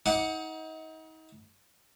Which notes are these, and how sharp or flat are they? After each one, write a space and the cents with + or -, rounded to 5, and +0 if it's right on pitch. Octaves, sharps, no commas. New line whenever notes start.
D#4 +35 F#5 +0 D6 +20